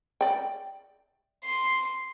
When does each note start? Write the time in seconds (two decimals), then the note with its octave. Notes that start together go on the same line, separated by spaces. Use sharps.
0.21 D5 G5
1.45 C6